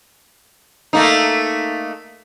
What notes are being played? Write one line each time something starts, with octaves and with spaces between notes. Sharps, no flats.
A3 A#3 D#4